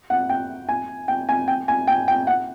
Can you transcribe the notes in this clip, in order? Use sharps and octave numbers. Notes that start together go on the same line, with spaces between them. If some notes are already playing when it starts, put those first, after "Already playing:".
F#5
G5
G#5
G5
G#5
G5
G#5
G5
G5
F#5